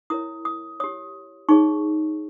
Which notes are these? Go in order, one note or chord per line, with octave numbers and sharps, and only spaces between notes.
E4 A#4 C#5 D#6
D#6
G4 C#5 D#6
D#4 G#4 C#5 C#6